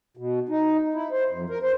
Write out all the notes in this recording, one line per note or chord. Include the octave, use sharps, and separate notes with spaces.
B2
D#4
E4
C5
F2
A#4
C5